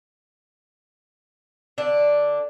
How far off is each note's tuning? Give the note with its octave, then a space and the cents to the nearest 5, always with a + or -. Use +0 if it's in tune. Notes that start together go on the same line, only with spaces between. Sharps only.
D3 +0 D4 +0